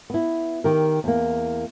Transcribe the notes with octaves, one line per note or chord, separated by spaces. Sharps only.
B3 E4
D#3 G4 A#4
E2 A#3